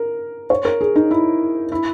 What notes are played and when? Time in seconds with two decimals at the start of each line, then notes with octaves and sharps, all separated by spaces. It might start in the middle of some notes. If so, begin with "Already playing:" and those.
Already playing: A#4
0.50 C#5
0.65 A#4
0.81 G#4
0.96 D#4
1.11 E4
1.72 E4